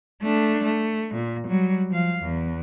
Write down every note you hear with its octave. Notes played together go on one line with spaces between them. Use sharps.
A3 D4
A3
A#2
F#3 G3
F3 F5
E2